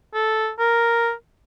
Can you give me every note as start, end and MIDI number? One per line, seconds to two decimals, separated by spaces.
0.14 0.51 69
0.59 1.12 70